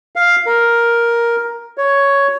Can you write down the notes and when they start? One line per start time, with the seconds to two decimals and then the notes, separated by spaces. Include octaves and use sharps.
0.16 F5
0.46 A#4
1.78 C#5